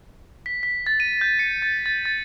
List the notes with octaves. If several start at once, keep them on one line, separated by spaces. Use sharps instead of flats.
B6
B6
A6
D#7
G6
C#7
A6
A6
A6